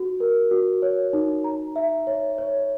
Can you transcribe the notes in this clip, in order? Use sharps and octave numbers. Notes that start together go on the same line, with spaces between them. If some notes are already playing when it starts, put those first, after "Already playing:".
Already playing: F#4
A#4
F#4
C#5
D#4
A#5
E5
C#5
C#5